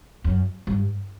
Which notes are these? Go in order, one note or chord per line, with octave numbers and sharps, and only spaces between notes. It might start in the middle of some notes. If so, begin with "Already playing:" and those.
F#2
G2